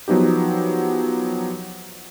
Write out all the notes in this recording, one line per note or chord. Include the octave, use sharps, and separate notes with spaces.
F3 F#3 B3 D#4 G4